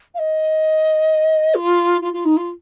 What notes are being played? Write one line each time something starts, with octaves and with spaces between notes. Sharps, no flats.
F5
D#5
F4
F4
F4
D#4
F4